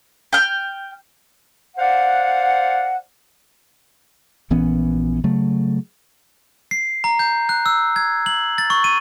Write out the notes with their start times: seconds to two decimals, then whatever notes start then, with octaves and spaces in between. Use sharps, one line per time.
0.33 G5 F6
1.78 C5 D5 F5 F#5
4.50 A#1 E3 B3 C#4
5.24 C#3 F#3 A3
6.71 C7
7.04 A#5
7.19 G6
7.49 F#6
7.66 E6
7.96 G#6
8.26 F#7
8.58 A6
8.70 C#6
8.84 D#7